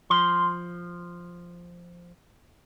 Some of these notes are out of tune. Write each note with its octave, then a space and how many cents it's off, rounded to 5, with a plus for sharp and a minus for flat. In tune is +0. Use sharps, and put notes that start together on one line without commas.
F3 +0 C6 +0